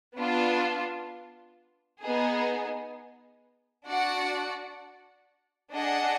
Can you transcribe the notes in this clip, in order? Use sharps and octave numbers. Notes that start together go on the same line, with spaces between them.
B3 D4 F4
B3 D#4 G#4
D4 F#4 D5 F#5
D4 G#4 D#5 F#5